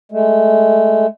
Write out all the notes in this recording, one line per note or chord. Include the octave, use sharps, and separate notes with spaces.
G#3 A3